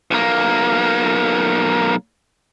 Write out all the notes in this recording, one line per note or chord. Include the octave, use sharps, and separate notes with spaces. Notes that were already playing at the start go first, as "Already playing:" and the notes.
B1 A#3